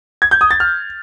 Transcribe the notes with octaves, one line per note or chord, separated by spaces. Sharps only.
G#6
G6
D#6
A6
F6